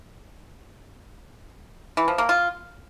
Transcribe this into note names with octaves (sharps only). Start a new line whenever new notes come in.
E3
F3
A#3
F4